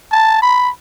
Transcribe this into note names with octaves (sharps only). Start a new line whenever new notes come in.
A5
B5